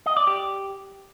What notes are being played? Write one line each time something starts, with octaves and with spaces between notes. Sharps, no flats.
D#5
D5
G4